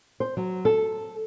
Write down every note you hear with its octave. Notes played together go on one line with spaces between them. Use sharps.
C5
F#3
A4